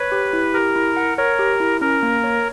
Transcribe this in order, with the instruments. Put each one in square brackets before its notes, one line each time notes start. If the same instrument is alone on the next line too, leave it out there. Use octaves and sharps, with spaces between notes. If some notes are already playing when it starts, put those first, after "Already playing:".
Already playing: [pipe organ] B4 [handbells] C#5
[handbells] G4
E4
[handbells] G4 [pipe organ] A#4
[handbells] E4
F#5
[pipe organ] A#4 [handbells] C#5
[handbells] G4
E4
[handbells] C#4 [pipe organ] A#4
[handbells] A#3
C#5